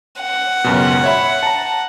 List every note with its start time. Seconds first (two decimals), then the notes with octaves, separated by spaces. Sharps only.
0.22 F#5
0.64 C#2 F#2 B2
1.04 C#5 E5 B5
1.43 A5 A#5